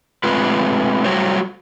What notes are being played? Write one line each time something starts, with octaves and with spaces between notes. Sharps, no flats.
G#3 A3 C4 F4 B4
F#3 G3 A3 F#4 C5 C#5